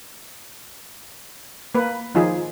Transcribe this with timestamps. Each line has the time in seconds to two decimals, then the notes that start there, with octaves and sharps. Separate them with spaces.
1.75 A#3 B4
2.15 D#3 F3 D#4 F4 G#4